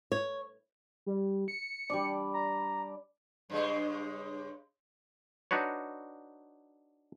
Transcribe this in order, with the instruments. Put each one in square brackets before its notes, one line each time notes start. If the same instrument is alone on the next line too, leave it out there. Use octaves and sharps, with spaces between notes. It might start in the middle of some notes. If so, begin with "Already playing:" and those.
[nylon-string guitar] C#5
[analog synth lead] G3
C#7
[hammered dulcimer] G3 D4 D5
[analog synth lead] A#5
[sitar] G2 C#3 G#3
[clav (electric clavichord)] D4 D#4 F#4 B4 C#5